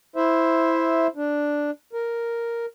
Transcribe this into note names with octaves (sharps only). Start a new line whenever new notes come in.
E4 C5 E5
D4
A#4